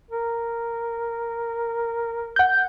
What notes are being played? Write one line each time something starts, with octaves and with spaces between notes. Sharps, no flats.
A#4
F#5 G6